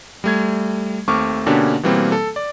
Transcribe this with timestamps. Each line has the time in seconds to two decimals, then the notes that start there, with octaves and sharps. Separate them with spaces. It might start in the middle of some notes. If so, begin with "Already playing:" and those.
0.24 G3 A3 G#6
1.08 D#2 A3 C4 C#6 D6 F6
1.46 B2 D3 A#3 C#4 D4 G4
1.83 B2 E3 G3 A#3 C4
2.12 A4
2.36 D5